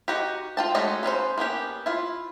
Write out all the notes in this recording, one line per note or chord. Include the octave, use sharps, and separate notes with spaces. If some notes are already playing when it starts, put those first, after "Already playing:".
D#4 F#4 G4
F4 G5 A5
G#3 A3 C#4 D#4 F#4
B3 C#4 F4 C5
A#3 B3 C#4 G4
E4 F4